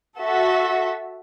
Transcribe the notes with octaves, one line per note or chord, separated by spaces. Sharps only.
F#4 A4 E5